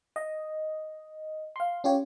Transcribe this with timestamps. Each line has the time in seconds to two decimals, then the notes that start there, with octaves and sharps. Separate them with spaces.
0.16 D#5
1.56 F5 C6
1.84 C#4 F4 G4 C#5